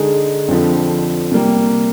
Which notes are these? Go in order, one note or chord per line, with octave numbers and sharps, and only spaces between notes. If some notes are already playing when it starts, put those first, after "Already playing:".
Already playing: D3 G#3 D#4 G#4
F2 D3 F3 C4
C3 G3 A#3